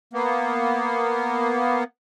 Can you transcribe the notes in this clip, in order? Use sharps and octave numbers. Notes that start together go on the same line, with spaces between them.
A#3 B3